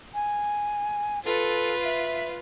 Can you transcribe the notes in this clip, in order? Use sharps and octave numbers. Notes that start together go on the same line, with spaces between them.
G#5
F4 A4 B4
E5